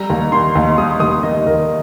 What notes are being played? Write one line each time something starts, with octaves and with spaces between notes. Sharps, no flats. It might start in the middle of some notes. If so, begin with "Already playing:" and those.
Already playing: G3 A#5
D#2
D#3 C6
D#2
C6
G3 D#6
D#2 D#6
D#3 D#5
D#2 A#4